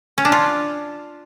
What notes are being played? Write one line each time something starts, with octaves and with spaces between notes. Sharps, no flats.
C#4
D4
F4